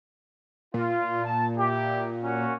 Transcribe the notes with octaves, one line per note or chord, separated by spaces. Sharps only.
A#2 F4
A5
E4 G4
A#3 C#4 F#4